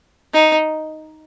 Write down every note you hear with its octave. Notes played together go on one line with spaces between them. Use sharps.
D#4